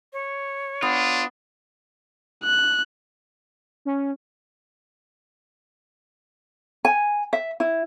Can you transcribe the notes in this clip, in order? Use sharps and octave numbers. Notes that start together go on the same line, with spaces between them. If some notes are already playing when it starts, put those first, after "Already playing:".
C#5
B3 D4 F4
F#6
C#4
G#5
E5
E4